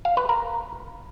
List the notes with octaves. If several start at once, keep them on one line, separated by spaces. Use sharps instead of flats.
F5
B4
A#4